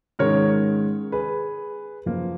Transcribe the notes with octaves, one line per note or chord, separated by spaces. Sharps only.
G#2 D#3 G#3 C#4 A#4 C#5
G#4 B4
F#2 F3 A#3